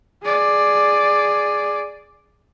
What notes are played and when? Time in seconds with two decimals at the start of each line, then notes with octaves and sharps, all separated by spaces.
0.23 G#4 D5